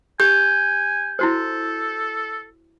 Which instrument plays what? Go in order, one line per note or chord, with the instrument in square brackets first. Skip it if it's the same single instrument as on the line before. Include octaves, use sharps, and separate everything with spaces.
[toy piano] G4 [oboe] G#5 [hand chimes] G6
[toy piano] E4 F#4 C5 [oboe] A4